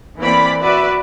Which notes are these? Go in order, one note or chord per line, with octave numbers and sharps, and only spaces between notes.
E3 A#3 C4 D5 B5
F#4 B4 D5 E5